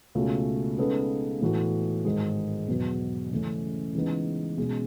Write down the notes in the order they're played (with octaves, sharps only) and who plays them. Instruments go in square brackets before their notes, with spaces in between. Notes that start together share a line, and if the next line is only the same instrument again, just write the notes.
[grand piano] C#2 B2 A3 C#4 F#4
C#3 G#3 B3 D#4 A4
A2 E3 B3 F#4 A4
G#1 G#2 D#3 G#3
E2 B2 F#3 B3
C#3 E3 A3 C#4
C#3 E3 G#3 B3 D#4
B2 G#3 C#4